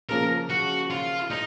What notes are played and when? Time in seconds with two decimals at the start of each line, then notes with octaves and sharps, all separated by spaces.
0.09 C#3 F3 A#3 C#4 A#4
0.50 F#4
0.90 F4
1.31 D#4